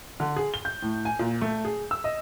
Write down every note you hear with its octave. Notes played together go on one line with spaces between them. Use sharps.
D3
G#4
G7
G6
A2
G#5
A#2
A3
G#4
E6
D#5